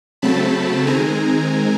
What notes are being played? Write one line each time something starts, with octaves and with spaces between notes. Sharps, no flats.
C#3 F#3 A3 C4 A5 B5
D#3 G#3 C4 G#5 A#5